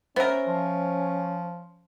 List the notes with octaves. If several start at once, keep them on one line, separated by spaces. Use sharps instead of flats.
B3 C#4 A#4 C5 E5
F3